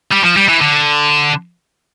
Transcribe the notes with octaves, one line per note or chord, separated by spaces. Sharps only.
G3
F3
G3
E3
D3